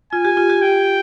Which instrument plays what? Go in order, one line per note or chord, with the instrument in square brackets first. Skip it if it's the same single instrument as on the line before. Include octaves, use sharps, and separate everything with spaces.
[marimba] F4 [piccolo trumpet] G#5
[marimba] G4
F4
G4
[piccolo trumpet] G5